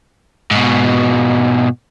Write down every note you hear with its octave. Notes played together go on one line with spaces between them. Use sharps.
G#2 B2